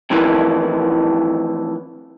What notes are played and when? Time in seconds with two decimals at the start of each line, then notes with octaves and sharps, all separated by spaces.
0.10 F2 A2 D#3 E3